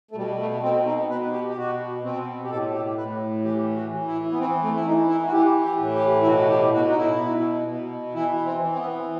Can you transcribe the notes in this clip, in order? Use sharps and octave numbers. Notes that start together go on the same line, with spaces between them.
A3
B2 G3
A3
B2 C4
D#4
B2 B4
G4
G4
B2 F#4
B2 C4
G4
A2 A4
G4
A2 B4
E3 G4
F#4
E3
E4
B3
E3 C4
A3
E4
E3 D#4
E4
F#4
E3 G4
G4
A2
G4
E4
B2 F#4
G4
B2 F#4
D#4
E4
B2
B2
E3 E4
C4
E3
C4
B3